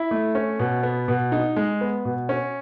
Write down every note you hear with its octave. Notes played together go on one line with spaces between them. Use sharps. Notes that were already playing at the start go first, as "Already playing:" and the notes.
Already playing: E4
A3
C#4
B2
B3
B2
D#4
G#3
B3
B2
C#4